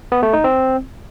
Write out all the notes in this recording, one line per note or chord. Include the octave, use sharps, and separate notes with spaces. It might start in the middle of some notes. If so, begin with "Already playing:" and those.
B3
A3
D#4
C4